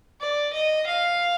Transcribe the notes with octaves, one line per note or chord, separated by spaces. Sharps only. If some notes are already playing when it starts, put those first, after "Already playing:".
D5
D#5
F5